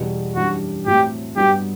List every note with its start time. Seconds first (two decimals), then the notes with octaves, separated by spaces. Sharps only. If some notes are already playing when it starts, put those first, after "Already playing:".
Already playing: E2 B2 G3 B3
0.35 F#2 E3 G3 D4 F#4
0.86 A2 F#3 A3 C4 G4
1.36 G2 F#3 B3 F#4 G4